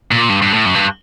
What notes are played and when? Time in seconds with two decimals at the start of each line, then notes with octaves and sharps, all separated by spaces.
0.11 A#2
0.29 G2
0.42 G2
0.54 A2
0.66 F#2
0.75 G2